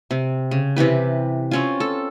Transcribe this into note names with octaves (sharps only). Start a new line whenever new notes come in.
C3
C#3
C3 E3 G4 B4
C4 C#4 F4
A4